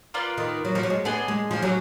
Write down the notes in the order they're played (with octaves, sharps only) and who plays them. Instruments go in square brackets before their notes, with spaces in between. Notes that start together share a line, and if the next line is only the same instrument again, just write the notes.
[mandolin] A#3 F4 B4 D5
[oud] D#3
F#3
F3
F#3
G#3
[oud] B3 [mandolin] D4 G#4 D#5 G#5
[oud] G#3
F3
F#3